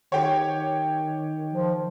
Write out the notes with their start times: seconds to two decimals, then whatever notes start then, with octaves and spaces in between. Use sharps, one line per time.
0.12 D#3 G4 C#5
1.53 F3